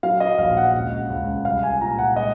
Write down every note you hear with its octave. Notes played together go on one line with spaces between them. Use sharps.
F#3 F5
D#5
A#1 F5
F#5
C#2
C#2
C2 F5
G#5
A#2 A#5
F#5
G#3 D#5